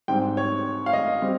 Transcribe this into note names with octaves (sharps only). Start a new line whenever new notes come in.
G#2 G3 C4 G5
C#5
F5
D#5
G3 C4